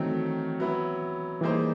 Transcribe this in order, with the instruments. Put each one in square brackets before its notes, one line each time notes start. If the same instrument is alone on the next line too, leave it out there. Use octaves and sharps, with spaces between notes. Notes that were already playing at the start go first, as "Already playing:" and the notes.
Already playing: [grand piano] D#3 F#3 A3 C4 [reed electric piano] E3
[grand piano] F#3 B3 E4
[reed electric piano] E3 [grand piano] G3 A#3 D#4 G#4 C5